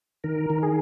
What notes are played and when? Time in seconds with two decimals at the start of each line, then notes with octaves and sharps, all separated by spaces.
0.24 D#3 A#4
0.50 D#3
0.63 G#4